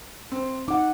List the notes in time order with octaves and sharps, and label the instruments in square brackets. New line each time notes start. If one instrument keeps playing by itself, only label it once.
[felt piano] C4
[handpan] D#4 F#5 [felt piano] D6